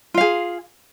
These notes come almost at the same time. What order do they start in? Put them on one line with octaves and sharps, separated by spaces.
F4 F5 G#4